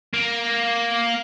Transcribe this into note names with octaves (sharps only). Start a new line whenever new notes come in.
A#3